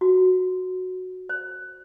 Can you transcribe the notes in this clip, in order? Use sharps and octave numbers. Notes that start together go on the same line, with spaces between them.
F#4
C5